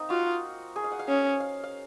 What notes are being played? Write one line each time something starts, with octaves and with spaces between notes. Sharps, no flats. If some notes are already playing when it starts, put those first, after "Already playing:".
Already playing: A#3 C4 D#4
F4 F#4
G#4
F5
F#5
F5
C#4
F5
F5